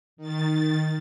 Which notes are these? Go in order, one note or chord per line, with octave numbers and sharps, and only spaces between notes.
D#3 A6